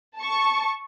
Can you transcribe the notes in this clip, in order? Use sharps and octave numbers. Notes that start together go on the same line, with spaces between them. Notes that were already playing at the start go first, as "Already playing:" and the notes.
A5 C#6